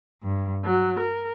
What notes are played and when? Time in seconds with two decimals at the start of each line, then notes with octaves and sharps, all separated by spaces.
0.23 G2
0.65 F#3
1.00 A#4